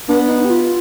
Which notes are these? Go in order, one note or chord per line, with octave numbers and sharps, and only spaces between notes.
B3 D4
D#4
G4
F4